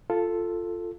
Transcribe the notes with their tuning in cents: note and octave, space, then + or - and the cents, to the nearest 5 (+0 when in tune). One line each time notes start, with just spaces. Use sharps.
F4 +0 A4 +5